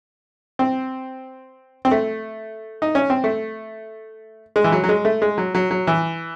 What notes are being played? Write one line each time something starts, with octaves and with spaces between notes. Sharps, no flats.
C4
C4
A3
D#4
C#4
C4
A3
G#3
E3
F#3
F#3
G#3
A3
G#3
F#3
F#3
F#3
E3